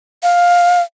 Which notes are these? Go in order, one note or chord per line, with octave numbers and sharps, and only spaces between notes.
F5